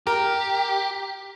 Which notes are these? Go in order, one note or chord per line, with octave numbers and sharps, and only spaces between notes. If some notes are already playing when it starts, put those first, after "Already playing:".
G4 A#4